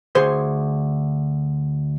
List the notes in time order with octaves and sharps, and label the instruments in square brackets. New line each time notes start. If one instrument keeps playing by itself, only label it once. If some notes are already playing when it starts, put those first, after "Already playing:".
[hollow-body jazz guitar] D2 G#4 C5 C6